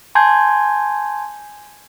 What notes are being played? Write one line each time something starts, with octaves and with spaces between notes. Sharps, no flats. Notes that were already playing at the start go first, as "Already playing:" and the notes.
G#5 A5 C6 G6 G#6